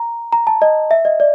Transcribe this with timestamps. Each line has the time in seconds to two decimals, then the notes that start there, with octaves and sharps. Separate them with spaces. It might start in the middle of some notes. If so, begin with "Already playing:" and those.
Already playing: A#5
0.33 A#5
0.47 A5
0.62 D#5
0.91 E5
1.05 D#5
1.20 D5